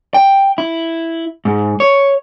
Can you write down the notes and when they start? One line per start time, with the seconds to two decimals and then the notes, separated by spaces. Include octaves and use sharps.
0.14 G5
0.58 E4
1.45 G#2
1.80 C#5